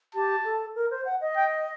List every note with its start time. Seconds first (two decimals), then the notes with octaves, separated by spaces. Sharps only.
0.15 G4 A5
0.45 A4
0.75 A#4
0.91 C5
1.05 F#5
1.21 D#5
1.36 G5